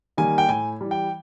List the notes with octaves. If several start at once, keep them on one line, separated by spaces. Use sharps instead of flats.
D#3 G3 A#3 G#5
G5
A2 G#5
E3 G3
G5